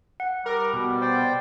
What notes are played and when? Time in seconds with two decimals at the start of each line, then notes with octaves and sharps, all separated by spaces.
0.20 F#5
0.46 G3 A#4
0.73 B2
1.01 C5 D5 G5